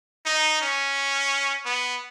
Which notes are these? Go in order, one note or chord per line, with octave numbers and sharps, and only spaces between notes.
D#4
C#4
B3